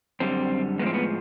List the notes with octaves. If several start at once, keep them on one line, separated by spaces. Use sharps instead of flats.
F#2 D3 G3 C4
A2 F3 G#3 B3 C4
B3